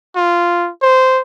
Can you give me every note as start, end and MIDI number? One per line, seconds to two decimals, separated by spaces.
0.16 0.70 65
0.82 1.22 72